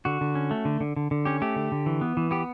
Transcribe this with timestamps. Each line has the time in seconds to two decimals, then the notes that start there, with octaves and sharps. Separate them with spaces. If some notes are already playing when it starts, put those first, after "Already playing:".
0.05 D3 F#4
0.21 D3
0.35 C#4
0.51 A3
0.65 D3
0.81 D3
0.96 D3
1.11 D3
1.25 C#4 G4
1.42 A3 G4
1.56 D3
1.72 D3
1.86 E3
2.01 B3
2.17 E3
2.31 B3 G4